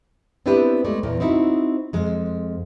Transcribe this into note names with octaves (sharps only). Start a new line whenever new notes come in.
B3 C4 D4 E4 G4 B4
G#3 A3 D5
E2 A#2 E3
C4 D#4 E4 F#4
F2 G#3